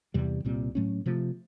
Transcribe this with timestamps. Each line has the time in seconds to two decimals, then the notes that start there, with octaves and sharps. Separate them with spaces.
0.14 E2 C3 E3 G3
0.45 C2 A#2 G3 C4
0.75 A2 F#3 A3 C#4
1.06 C3 F3 A3